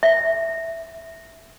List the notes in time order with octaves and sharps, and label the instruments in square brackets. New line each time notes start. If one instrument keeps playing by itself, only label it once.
[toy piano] E5